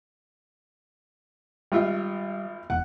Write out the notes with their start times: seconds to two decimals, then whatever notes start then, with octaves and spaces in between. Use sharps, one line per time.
1.72 G#1 G3 F4 E5
2.70 E1 F#5